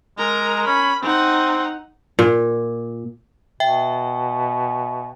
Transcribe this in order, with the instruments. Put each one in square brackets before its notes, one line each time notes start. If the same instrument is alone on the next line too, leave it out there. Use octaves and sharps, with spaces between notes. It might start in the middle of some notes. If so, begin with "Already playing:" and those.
[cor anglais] G#3 [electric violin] A#4 A#5
[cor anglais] C#4 [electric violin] B5
[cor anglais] C4 [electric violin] D#4 F#5
[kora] A#2
[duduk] B2 [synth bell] E5 G5